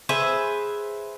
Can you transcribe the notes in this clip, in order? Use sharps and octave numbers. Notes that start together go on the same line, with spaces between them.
G#4 B4 C5 E5